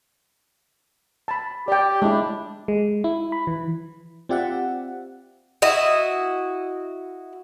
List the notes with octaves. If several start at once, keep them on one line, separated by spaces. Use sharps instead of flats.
A5 B5
G4 D5 G5
G#3 D4 E4
G#3
E4
B5
E3
C4 F4 G4 D5 E5 F#5
E4 F#4 D#5